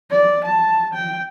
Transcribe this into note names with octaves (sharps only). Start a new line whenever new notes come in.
D5
A5
G5